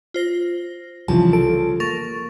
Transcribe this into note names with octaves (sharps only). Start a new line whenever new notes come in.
F4 C5 A#6
C2 C#3 E3 F3 G3 A5
A4 D7
A#3 A#4 C#6 A6